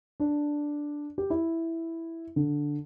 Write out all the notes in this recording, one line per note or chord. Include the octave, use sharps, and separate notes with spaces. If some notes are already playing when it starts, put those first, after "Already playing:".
D4
G4
E4
D3